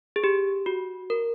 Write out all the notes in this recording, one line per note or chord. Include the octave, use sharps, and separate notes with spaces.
G#4
G4
F#4
A#4